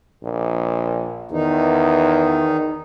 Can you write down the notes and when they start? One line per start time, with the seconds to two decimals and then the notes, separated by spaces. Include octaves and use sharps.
0.24 A#1
1.31 E2 D#3 D#4